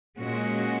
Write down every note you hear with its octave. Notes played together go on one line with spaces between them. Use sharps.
A#2 G#3 C#4 F#4